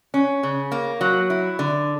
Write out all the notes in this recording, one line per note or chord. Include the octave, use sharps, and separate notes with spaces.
C#4
C#3
A#3
F#3
E4
D3